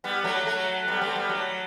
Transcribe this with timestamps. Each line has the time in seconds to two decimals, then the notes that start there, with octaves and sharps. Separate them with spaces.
0.04 G3 B3
0.24 F#3 A3
0.46 F#3 A3
0.88 G3 B3
1.01 A3 C4
1.16 G3 B3
1.29 F#3 A3